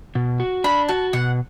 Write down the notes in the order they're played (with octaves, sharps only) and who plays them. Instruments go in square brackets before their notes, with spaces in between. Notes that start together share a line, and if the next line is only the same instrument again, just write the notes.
[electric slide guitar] B2
F#4
[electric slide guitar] D4 [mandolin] B5
[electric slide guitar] F#4 [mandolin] A5
[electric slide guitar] B2 [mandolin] F#5